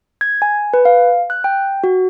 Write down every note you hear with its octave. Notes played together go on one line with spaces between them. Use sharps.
G#6
G#5
B4
F5
F#6
G5
F#4